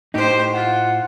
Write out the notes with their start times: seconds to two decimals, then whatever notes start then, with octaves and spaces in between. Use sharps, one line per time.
0.14 A2 D#4 G4 C5
0.54 F4 F#5